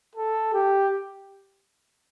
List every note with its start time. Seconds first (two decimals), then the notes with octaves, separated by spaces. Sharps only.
0.15 A4
0.53 G4